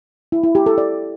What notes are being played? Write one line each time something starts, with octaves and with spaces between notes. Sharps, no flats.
E4
E4
G4
A4
D5